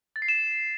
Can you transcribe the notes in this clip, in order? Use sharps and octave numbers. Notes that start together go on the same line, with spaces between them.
A6
C7
E7